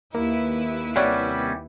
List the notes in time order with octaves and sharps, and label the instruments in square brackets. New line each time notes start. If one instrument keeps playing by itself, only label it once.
[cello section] D#2 E4 B4 [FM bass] A#3
[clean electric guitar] C3 G3 C#4 [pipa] C#5 D5 F#5